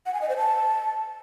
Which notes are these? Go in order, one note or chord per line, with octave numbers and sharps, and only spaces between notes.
F#5
G#5
D#5
C5
A5